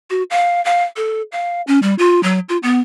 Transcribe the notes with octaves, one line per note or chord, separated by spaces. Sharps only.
F#4
F5
F5
A4
F5
C#4
G3
F4
F#3
F4
B3